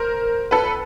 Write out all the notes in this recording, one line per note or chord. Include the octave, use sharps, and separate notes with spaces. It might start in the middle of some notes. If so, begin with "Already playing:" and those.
Already playing: A#4 C5
A4 B4